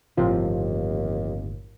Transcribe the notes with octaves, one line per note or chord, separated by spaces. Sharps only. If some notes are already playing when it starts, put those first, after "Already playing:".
G1 D#2 A2 C3 F3 F4